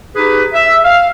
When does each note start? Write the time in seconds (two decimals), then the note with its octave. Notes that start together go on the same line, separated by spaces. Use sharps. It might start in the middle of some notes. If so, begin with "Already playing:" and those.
0.15 D#4 G4 G#4 B4
0.53 E5
0.84 F5